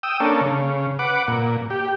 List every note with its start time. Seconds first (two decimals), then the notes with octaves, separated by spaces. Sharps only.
0.03 G5 D#6 E6
0.20 A#3 C#4 D4 A4
0.41 C#3
0.99 B4 F#5 D6
1.28 A#2
1.70 G4